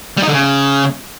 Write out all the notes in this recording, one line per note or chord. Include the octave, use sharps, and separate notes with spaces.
G3
D#4
D3
C#3